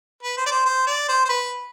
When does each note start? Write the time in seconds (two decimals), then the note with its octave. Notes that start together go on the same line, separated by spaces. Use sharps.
0.23 B4
0.37 C5
0.46 D5
0.51 C5
0.65 C5
0.87 D5
1.09 C5
1.25 C5
1.29 B4